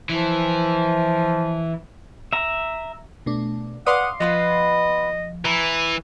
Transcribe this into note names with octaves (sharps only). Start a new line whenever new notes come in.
E3 F3
E5 A#5
B2 A3 D4
B4 D5 F5 F#5 C6 D6 D#6
F3 B3 F4 B4 D#5
E3 A#5